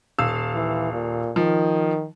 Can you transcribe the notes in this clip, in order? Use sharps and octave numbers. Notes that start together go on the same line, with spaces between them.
D#1 F5 E6
E3
A#2
D#3 F3